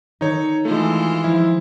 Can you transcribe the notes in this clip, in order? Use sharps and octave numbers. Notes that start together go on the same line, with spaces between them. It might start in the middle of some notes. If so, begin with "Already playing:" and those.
D#3 D#4 A4 C#5
E3 G#3 A3 F4
F3 E4